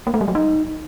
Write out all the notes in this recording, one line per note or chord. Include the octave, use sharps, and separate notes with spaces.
A#3
A3
G3
F#3
D#4